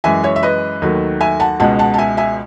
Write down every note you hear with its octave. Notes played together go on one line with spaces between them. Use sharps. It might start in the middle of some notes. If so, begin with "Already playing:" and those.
F#2 E3 G#3 E5 G#5
C#5 E5
E5
B4 D#5
D#2 D#3 F#3 A3
E5 G#5
F#5 A5
C#2 B2 G#3 F#5 A5
F#5 A5
A5
E5 G#5
E5 G#5